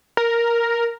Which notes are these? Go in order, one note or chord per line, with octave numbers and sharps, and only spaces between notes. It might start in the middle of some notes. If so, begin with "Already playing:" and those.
A#4